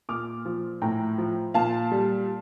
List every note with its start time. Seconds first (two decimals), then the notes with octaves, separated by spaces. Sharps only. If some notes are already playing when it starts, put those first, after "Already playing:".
0.09 A#2 D6 F6
0.45 F3
0.82 A2 G5 A#5
1.18 F3
1.54 A#2 F5 A5
1.92 G3